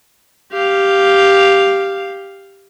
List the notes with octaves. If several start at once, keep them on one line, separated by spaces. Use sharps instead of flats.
G4 F5